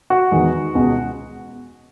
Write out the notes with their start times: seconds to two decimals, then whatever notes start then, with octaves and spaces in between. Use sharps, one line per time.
0.10 F#4
0.31 E2 D#3 G#3
0.75 C#2 B2 G#3